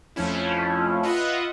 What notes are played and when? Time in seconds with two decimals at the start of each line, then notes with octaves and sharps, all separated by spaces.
0.16 F2 F3 A3 C#4 E4
1.03 F4 B4 D#5 E5 F#5